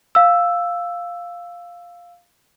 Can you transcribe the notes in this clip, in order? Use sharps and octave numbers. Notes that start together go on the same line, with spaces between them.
F5 E6